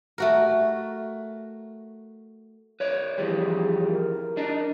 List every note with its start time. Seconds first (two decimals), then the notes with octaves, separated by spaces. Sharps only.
0.18 A3 F#4 A#4
2.80 B4 C#5 D5
3.18 F2 E3 G3 G#4
3.91 A#4
4.37 D4 D#4